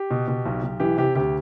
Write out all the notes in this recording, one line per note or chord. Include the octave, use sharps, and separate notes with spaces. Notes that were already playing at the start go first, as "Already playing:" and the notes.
Already playing: G4
B2
B2
B1
B1
E3 G4
C3 G4
D2 G4